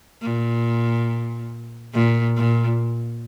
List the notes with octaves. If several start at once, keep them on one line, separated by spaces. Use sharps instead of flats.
A#2
A#2
A#2